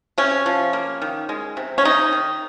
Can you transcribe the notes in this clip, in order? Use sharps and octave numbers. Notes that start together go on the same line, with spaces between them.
C3 C#4
F3
A#3
D#3
G#3
C3
C#4
C3 D#4
D#3